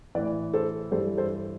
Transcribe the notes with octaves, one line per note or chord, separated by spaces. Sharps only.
A2 E3 B4 D5
A4 C5
G2 A4 C5
E3
A4 C5